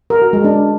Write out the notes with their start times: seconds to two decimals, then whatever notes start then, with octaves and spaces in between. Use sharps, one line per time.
0.10 A#4
0.22 F#4
0.33 G#3
0.44 D4